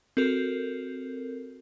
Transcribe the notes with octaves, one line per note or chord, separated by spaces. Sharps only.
C4 F#4 A4 A#4